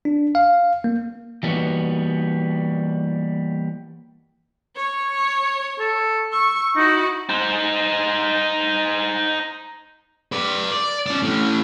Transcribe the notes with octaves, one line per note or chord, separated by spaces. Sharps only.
D4
F5
A#3
E3 G3 A#3 B3 D#4 F#4
C#5
A4
C#6 E6
D#4 E4 F#4
D#4 C5
B4 D5
D5
C#4 D5
A2 C#4